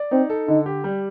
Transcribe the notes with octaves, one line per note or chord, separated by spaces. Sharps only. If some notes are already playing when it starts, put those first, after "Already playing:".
Already playing: D5
C4 D#4
A4
D3 D#4
G4
G3